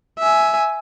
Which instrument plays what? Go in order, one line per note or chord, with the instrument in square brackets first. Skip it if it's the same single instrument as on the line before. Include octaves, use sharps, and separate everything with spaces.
[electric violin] E5 G#5